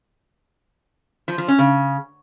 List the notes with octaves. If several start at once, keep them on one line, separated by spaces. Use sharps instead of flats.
F3
F3
C#4
C#3